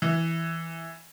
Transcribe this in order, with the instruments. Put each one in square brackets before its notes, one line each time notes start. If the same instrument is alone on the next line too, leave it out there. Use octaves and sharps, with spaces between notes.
[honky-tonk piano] E3